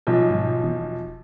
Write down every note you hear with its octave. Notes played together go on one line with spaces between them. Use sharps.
B1 F3
G#1
E1